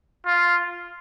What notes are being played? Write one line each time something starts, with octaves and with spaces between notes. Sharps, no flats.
F4